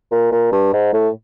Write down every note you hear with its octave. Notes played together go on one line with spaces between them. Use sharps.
A#2
A#2
G2
G#2
A2